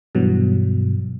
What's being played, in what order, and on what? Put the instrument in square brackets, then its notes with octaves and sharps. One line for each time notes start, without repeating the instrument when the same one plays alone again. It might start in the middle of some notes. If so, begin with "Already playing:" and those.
[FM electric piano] G2 B2 E3 F#3